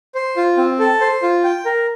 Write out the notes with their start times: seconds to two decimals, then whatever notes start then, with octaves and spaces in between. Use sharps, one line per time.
0.15 C5
0.36 F4
0.57 C4
0.79 A4
1.01 C5
1.22 F4
1.44 G5
1.65 A#4